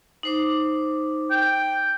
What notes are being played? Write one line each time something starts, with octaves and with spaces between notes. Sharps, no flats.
D#4 C5 D6
G5